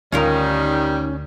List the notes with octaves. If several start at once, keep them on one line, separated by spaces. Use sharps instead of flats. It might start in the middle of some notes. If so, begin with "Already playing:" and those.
D2 D#3 G3 C#4 D#4 F4 A#4